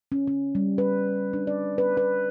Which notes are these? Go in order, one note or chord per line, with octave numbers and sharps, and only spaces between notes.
C#4
C#4
G3
B4
D4
D5
B4
B4